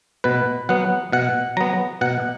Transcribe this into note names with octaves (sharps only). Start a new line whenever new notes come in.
B2 B4
F#3 B3 F#5
B2 F#5
F#3 B3 A#5
B2 F#5